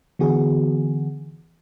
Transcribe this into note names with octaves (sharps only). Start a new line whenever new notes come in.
D3 E3 B3 F#4 G#4